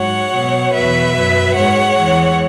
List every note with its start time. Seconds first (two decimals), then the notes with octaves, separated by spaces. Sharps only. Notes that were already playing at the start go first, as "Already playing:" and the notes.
Already playing: G#2 F#3 C#5 F#5
0.32 B2 F#3
0.73 E2 B2 F#3 B4 E5
1.15 F#2 F#3
1.56 G#2 G#3 C#5 F#5
1.97 E2 E3 G#3